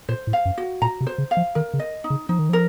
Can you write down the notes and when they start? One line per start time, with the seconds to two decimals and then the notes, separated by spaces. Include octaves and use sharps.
0.09 A#2 C5
0.27 A2
0.33 F5
0.45 F#2
0.58 F#4
0.82 A#2 A#5
1.01 C3
1.07 C5
1.18 C#3
1.31 F5
1.37 F3
1.55 D#3 A#4
1.74 C#3
1.80 D#5
2.04 D#4
2.10 C#3
2.29 F3 D#4
2.39 D#3
2.49 F3 A#4